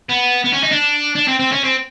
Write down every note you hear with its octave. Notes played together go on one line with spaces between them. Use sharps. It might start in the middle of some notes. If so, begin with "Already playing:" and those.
B3
B3
C#4
D#4
D4
D4
C4
C4
C#4
C4